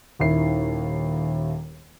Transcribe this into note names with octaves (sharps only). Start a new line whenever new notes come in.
D#1 D#2 D#3 E4 C7